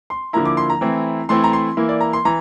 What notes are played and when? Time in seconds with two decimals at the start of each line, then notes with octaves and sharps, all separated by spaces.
0.10 C6
0.33 D3 F3 A#3 E4 A#5
0.45 D6
0.57 C6
0.70 A#5
0.81 E3 A3 C4 E4
1.29 E3 A3 C4 E4 C6
1.44 A#5
1.53 C6
1.77 E3 A#3 E4
1.89 D5
2.01 A#5
2.13 C6
2.25 E3 A#5